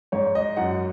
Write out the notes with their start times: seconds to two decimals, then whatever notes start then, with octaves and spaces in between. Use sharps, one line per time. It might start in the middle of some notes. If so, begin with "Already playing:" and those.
0.12 G#2 C#5
0.35 D#5
0.57 F#2 F#5